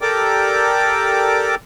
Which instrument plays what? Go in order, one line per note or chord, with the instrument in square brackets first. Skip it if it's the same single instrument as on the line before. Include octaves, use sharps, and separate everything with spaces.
[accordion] G4 A4 A#4 D5 G5 D6